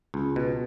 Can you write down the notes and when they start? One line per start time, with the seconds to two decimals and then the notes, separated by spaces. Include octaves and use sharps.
0.14 C#2
0.36 B2